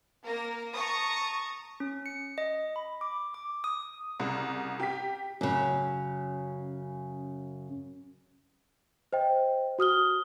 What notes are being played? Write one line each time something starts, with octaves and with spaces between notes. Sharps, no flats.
A#3 A#4 A#6
A5 A#5 C#6 D#6
C#4
C#7
D#5
B5
D6
D6
D#6
C2 C#3
G4 B6
F#2 C#3
C5 D#5 G5
F#4 D#6 F6 G7